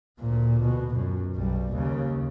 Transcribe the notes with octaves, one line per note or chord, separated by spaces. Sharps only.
D2 A#2
B2
F#2
B1 G3
D#2 C#3